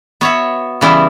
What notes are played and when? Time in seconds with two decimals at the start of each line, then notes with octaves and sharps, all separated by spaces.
0.21 B3 F#4 C#5 E5
0.81 C#3 E3 G3 B3 E4